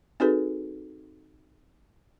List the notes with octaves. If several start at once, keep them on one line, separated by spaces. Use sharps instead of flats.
C4 D#4 F#4 G#4 A4 B4